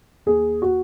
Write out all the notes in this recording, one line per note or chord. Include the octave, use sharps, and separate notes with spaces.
D#2 G#4
F#4